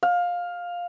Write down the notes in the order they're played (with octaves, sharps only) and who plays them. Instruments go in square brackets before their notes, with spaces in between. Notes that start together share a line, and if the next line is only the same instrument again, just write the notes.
[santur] F5